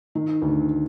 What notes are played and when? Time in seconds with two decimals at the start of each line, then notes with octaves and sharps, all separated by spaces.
0.15 D#3
0.42 D2